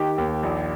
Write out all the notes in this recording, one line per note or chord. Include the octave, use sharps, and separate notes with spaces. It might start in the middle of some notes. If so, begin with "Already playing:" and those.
Already playing: D#3 G4
D#2
A#1